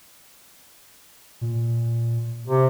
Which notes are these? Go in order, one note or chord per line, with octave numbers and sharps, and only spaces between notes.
A#2
C3